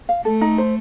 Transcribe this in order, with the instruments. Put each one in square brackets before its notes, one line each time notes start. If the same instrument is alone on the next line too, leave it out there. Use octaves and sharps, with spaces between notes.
[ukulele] F5
[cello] A3 [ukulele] A4
[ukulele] D#4
C5